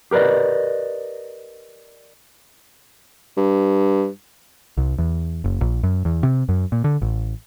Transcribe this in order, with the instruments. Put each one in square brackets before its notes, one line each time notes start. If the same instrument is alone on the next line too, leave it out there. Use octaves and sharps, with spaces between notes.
[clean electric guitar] G4 A#4 B4 D5 D#5
[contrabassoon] G2
[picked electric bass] C2
E2
F#1
A#1
F#2
E2
C3
F#2
A#2
D3
A1